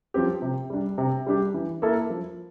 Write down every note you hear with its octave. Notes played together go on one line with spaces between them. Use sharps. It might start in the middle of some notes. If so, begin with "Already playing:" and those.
F3 C4 G4
C3
G3 D4
C3
G3 D4 G4
E3
A#3 E4 A4
F3